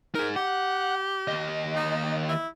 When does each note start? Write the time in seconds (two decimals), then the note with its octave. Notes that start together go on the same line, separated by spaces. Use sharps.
0.15 D#4 G#4 A#4
0.36 G4 F#5
1.28 D#2 D#5
1.76 D#4
2.29 E4